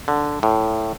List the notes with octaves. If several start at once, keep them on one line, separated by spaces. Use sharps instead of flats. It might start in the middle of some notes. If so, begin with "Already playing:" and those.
D3
A2